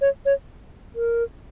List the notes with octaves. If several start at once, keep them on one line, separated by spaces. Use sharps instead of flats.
C#5
C#5
A#4